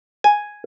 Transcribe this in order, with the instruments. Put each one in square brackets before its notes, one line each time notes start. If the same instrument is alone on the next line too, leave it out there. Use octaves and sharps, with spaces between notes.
[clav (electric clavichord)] G#5